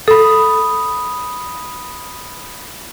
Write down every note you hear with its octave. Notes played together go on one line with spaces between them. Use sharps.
A4 B5 D#6